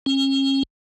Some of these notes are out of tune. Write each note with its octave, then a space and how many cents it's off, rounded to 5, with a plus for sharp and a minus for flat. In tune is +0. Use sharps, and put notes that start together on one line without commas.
C#4 -40